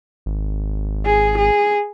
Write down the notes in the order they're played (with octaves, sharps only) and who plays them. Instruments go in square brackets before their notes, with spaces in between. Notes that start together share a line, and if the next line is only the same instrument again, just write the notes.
[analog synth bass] G#1
[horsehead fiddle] G#4
G#4